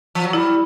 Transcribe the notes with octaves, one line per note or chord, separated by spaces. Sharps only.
F3
F#3
G3 E4